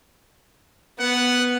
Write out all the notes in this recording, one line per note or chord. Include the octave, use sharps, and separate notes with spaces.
B3 F#5